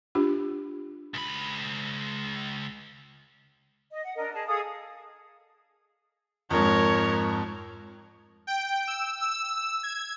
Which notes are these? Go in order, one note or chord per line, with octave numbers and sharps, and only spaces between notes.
D4 F4 G4
C#2 B5
D#5
F#5
D4 A#4 D#5
G#4 D#5 A5
G#4 A4 F5 D#6
F2 G#2 A#4 C#5
G5
E6
E6
G#6